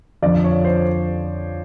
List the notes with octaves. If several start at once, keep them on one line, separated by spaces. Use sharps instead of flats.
F2 D3 F3 D5
C#5
C5